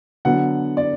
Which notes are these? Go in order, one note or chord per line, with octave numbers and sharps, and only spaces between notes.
D3 F#3 B3 F#5
D5